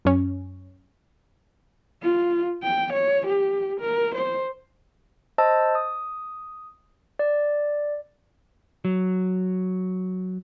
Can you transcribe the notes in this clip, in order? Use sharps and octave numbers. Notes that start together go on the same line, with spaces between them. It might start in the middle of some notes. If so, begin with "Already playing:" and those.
F#2 C#4
F4
G5
C#5
G4
A#4
C5
C5 D#5 A5 E6
D#6
D5
F#3